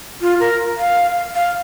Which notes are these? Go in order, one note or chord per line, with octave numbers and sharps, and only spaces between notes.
F4
A#4
F5
F5